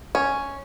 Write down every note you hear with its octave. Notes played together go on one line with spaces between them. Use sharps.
C#4